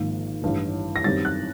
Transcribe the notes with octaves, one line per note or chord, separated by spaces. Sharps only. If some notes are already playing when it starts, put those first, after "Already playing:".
Already playing: G#1 G#2 F3 A#3
A1 G2 E3
A#6
F#2 D#3 G3 C4 D#4 A6
F#6